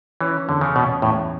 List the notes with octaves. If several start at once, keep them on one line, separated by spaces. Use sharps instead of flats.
E3 C#4
E2 D3
C#3
B2 C#4
E2 A2